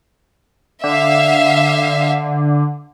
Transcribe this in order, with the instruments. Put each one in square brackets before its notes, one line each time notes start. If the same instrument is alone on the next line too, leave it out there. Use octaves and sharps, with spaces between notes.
[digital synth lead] D3 [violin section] E5 F5